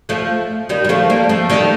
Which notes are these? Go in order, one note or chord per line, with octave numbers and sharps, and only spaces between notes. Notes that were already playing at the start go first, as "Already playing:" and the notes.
F3 A3
D#3 G3
G3
F3 A3
G3 A#3
F3 A3
D#3 G3